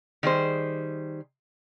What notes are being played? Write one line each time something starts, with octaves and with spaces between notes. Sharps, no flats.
D#3 G3 G#4 C5